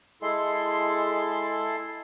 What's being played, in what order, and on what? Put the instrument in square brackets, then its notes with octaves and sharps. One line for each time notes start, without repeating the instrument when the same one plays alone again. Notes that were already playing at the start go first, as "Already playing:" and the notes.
[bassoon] G#3 [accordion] E4 A4 C6